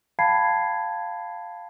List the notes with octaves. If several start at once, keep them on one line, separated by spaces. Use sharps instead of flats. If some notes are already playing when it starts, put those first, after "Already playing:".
F5 G5 A5 B5 G#6 C7